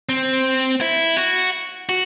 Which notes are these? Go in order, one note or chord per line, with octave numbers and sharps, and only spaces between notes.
C4
E4
F#4
F#4